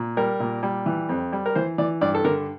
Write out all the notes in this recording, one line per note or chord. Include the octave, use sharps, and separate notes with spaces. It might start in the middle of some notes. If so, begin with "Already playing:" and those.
Already playing: A#2
G3 A#4
A#2
G3
E3
F2
G3
A#4
E3 C5
E3 D5
G2 D5
A4
D3 A#4